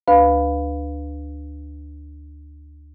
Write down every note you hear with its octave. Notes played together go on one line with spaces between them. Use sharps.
D2 B4 F5 B5